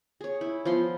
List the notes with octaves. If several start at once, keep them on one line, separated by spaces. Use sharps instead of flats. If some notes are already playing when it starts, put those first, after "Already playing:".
G#4 C#5
E4
F3 B3 F5 C6